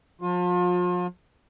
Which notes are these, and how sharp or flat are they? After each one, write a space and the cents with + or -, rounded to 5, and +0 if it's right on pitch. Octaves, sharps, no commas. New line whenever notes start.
F3 +40 F4 +35